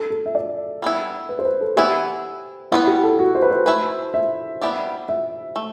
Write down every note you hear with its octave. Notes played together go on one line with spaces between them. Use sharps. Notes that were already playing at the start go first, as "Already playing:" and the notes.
Already playing: A4
A4
E5
D5
G3 B3 E4
B4
C5
B4
A4
E3 B3 E4 G4
G3 B3 E4 F#4 B4
G4
A4
F#4
C5
B4
C5
A3 E4 B4
E5
G3 B3 E4 G4 D5
E5
A3